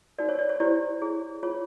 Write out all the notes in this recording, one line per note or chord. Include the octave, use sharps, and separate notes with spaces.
D#4 F#4 A#4 D5
C#5
D5
C#5
E4 G4 C5 D5
E4 G#4 C#5
F4 G#4 C#5